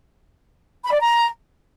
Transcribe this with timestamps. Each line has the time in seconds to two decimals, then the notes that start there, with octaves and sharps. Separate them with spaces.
0.84 B5
0.92 D5
1.00 A#5